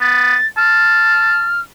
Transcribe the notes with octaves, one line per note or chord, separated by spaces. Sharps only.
B3 A6
A5 F6